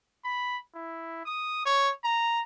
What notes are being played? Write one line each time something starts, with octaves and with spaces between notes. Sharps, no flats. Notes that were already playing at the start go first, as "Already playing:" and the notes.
B5
E4
D#6
C#5
A#5